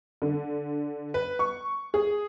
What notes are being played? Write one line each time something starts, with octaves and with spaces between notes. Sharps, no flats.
D3
B4
C#6
G#4